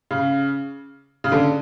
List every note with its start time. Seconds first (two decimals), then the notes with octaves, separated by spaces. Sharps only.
0.11 C#3
1.24 C#3
1.32 D3